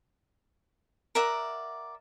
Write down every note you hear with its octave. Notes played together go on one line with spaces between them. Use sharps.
A#4 D5 E5 F#5